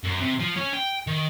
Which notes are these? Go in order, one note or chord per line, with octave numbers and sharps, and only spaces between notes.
F#2
C3
F3
C#4
G5
D#3